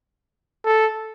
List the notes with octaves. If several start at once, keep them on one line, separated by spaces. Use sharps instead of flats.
A4